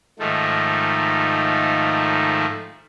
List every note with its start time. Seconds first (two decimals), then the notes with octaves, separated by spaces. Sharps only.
0.19 G#2 D#3 F3 A3